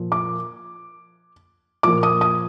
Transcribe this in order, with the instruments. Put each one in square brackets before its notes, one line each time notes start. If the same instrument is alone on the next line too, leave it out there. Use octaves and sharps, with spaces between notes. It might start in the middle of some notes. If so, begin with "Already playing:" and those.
Already playing: [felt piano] A#2 F3
D6
A#2 F3 D6
D#6
D#6